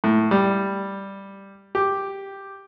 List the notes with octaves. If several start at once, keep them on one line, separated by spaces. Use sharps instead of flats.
A2
G3
G4